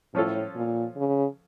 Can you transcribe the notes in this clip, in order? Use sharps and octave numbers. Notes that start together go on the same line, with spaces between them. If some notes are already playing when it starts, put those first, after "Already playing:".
A2 F3 C#4 F4 A4
A#2
C#3